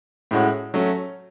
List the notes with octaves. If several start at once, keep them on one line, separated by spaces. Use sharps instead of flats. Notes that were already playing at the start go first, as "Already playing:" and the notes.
A2 G#3 C#4 F#4
F#3 A3 C#4